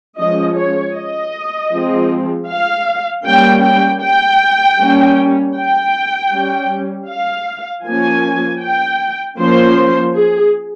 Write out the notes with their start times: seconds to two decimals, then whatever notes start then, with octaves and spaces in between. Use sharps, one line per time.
0.18 F3 G#3 C#4 D#5
0.56 C#5
0.95 D#5
1.73 F3 G#3 C4
2.49 F5
3.26 G3 A#3 C#4 G5
3.64 G5
4.02 G5
4.78 G3 A#3 C#4
5.56 G5
6.33 G3 C#4
7.09 F5
7.86 F3 A#3 C#4 G#5
8.62 G5
9.39 F3 A#3 C#4 C5
10.16 G#4